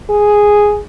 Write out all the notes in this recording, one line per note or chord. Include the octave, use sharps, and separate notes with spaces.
G#4